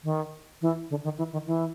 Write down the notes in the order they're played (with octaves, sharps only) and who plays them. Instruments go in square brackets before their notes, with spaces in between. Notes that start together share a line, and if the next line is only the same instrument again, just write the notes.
[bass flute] D#3
E3
D3
D#3
E3
D#3
E3